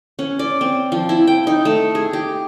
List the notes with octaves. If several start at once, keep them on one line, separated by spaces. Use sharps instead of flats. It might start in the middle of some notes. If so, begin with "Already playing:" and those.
C#4
D5
C4
F3
E4
G5
D#4
A3
G#4
G4